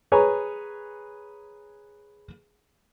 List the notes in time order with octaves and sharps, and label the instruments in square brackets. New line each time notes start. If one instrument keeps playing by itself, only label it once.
[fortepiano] G#4 B4 C#5 G#5 A#5